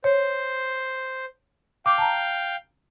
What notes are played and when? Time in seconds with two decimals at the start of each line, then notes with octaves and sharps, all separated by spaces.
0.04 C5 C#5
1.86 F5 G5 D6
1.98 A5 A#5